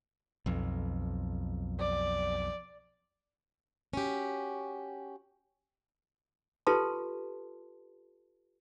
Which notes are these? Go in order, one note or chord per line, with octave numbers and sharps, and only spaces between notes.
B1 F2
D5
C#4 F#4 G4
F4 G4 A4 B4 A5 C6